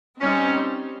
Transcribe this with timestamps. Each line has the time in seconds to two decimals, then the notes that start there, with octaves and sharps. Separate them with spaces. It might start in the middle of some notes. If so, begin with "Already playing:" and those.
0.21 G3 C4 C#4 D#4